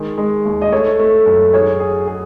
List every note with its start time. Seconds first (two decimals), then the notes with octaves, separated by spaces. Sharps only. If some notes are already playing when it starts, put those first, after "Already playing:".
Already playing: D#3 G#3
0.18 G#3
0.45 D#2
0.62 D#5
0.72 A3 C#5
0.99 A3
1.26 F#2
1.53 G#4 C#5
1.80 G#4
2.07 G#4